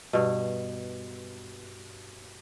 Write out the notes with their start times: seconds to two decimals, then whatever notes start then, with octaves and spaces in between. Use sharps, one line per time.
0.13 G2 B2